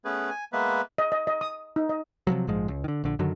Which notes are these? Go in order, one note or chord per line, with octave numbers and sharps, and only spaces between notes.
A3 B3 C#4 G#4 B4
G#5
G#3 A#3 B3 B4 E5
D#5
D#5
D#5
D#6
D#4
D#5
C3 D#3 F3 F#3
A#1 G#2 F3 G#3
C#2
D3 D#3
A#1 D3
F#2 D3 D#3 F#3